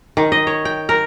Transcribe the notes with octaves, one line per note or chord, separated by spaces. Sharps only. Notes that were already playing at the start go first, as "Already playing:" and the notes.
D#3
D#5
C#5
G5
A#4